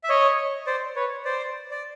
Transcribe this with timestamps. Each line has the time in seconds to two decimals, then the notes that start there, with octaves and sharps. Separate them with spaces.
0.04 E5
0.09 C#5 D#5
0.67 C5 D5
0.96 B4 C#5
1.25 C5 D5
1.71 D5